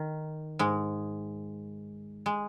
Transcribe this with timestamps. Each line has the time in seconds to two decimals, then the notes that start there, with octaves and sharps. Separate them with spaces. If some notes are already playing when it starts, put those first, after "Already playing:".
Already playing: D#3
0.59 G#2 G#3
2.26 G#3